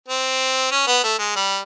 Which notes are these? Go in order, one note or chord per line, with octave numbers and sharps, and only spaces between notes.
C4
C#4
B3
A3
G#3
G3